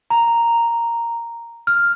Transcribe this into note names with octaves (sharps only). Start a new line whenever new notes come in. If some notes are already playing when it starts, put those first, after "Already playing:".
A#5
F6